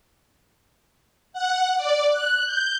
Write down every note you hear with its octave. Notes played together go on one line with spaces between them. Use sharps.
F#5
D5
F#6
G6